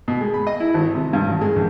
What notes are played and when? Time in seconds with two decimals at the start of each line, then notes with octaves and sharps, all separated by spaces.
0.08 B2
0.21 G#3
0.34 B5
0.47 D#5
0.60 E4
0.74 G#1
0.95 C3
1.13 G2
1.27 A1
1.41 G#3
1.56 A#1